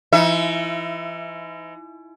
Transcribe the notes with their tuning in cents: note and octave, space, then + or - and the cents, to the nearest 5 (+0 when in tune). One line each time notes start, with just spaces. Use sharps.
E3 +40 D#4 +45 E5 +25